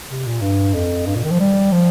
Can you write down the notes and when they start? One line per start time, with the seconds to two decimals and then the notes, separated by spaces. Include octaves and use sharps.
0.10 C3
0.26 A#2
0.41 G2
0.74 F2
1.06 G2
1.15 A#2
1.24 D#3
1.31 F3
1.40 G3
1.72 F3